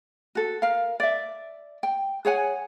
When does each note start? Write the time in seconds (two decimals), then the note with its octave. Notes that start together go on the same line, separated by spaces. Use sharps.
0.35 F#4 A4
0.62 A#4 F5
1.00 D5 E5
1.83 G5
2.25 G#4 C#5 F#5 G#5